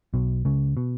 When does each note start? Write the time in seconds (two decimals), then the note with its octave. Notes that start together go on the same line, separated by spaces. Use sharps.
0.14 B1 B2
0.45 C#2 C#3
0.77 B2